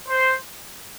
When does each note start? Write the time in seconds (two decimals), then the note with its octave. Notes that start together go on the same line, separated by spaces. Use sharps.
0.08 C5